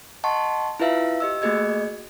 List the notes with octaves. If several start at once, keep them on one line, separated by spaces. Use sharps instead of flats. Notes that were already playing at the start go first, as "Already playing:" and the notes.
D#5 F#5 A5 C6 C#6
E4 F4 B4 E5 F5
G4 D#5 E6
A3 A#3 F#4 G#4 D#5 G#6